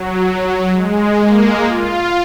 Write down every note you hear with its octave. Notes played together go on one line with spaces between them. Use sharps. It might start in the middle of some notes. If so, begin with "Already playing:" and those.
Already playing: F#3
G#3
A#3
F4